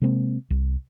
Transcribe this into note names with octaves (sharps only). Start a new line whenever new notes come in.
C3 G#3 A#3 C4
C2